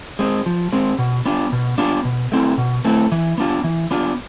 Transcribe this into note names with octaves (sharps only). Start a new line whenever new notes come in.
G#3 C4
F3
G#3 C4
B2
B3 D4 F4
B2
B3 D4 F4
B2
A3 C4 E4
B2
A3 C4 E4
E3
B3 D4 F4
E3
B3 D4 F4